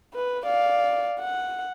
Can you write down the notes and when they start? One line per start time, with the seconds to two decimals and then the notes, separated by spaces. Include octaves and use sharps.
0.14 B4
0.45 D5 F5
1.20 F#5